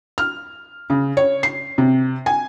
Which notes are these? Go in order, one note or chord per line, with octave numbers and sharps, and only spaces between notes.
F6
C#3
C#5
C7
C3
G#5